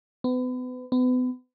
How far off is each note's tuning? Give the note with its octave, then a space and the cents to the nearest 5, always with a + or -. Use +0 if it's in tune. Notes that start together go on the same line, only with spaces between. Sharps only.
B3 +35
B3 +35